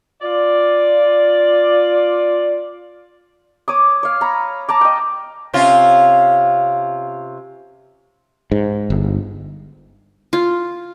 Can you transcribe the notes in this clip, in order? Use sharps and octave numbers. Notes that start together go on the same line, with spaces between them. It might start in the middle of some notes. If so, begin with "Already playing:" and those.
F4 D5
C#5 D6 D#6
C#5 F5
A#5 B5
A5 A#5 D6
D#5 G5
C3 C#4 F4
G#2
G1
F4